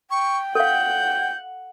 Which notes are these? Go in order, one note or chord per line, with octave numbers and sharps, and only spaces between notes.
G5 C#6
A4 F5 F#5 G6